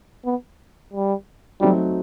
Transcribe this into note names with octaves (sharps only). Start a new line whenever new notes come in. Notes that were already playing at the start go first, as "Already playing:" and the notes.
B3
G3
F#3 G3 A3 C4 D#4 F#4